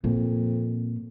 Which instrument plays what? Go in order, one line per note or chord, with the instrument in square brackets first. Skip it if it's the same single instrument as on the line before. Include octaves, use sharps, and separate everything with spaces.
[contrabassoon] F2 [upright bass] A#2